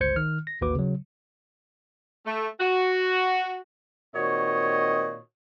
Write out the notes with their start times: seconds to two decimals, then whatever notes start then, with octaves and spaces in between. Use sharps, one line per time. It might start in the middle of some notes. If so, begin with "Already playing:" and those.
0.01 G1 C#2 C5 G6 G#6 C#7
0.16 D#3 F6
0.47 A#6
0.61 A1 D#2 A#3 F#4 B4 D6
0.75 C#3 F#3
2.26 A3
2.61 F#4
4.15 A#2 D#3 C4 F#4 C#5 D#5